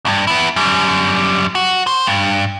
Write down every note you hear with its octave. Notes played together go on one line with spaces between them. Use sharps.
C#2 G2
B3 E4
F#2 G3
F#4
C5
G2